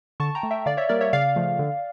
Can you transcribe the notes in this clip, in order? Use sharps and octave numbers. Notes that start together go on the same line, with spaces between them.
D3 A5 C#6
G5 A#5
A3
E5 G5
D3 D5 F5
C#5 E5
G3 A#3 A#4 D5
C#5 E5
C#3 D5 F5
F3 A3
D3